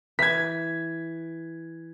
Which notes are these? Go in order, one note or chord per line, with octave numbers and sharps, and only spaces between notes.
E3 G#6 B6